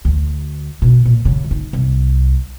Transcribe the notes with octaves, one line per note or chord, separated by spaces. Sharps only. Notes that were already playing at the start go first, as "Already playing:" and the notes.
D2
B2
A#2
C#3
D#4
C2